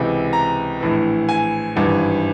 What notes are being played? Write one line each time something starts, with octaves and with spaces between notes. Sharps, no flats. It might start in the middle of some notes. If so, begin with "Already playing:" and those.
Already playing: C#2 C3 E3
A#5
A#1 A2 E3
G#5
G#1 G2 E3